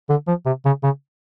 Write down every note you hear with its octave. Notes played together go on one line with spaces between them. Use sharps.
D3
F3
C3
C#3
C#3